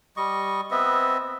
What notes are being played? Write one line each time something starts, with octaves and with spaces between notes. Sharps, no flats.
G3 D#5 C#6
B3 C4 D#5 E5